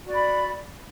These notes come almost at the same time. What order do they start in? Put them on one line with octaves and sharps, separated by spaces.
F#4 D5 B5